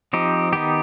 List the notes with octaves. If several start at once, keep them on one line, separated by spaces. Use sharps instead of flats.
F3 C4 D#4 G4
D#3 B3 D#4 G4